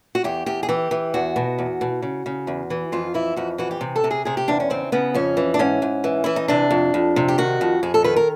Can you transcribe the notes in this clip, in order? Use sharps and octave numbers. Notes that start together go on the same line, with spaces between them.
F#4
E2 G4
E2 G4
G#4
E3 G4
E3
E2 F#4
B2
E2
B2
C#3
C#3
E2
E3
F2 F4
E3 E4
F2 F#4
E3 F#4
G4
C3
A4
C3
G#4
C3 G#4
G4
E2 D4
C#4
C#3 C4
C#3 B3
F2 C#4
E3
D4
G#2 C#4
G#2
E3
E3 E4
D#4
C3 D4
F2
F2
C3
G4
D#3 F#4
F2
F2 G#4
A4
D#3 B4
A#4